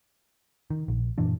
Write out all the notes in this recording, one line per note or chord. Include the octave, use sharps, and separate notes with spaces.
D#3
A#1
F#2 A#2 E3 D4